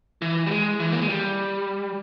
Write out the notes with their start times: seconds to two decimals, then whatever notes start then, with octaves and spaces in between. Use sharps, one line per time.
0.22 E3
0.47 G3
0.51 G#3
0.80 E3
0.92 A#3
1.01 G#3
1.09 G3